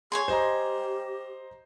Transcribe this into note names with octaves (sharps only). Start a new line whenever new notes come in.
G#4 C#5 G#5 C6
G4 C5 D#5 A#5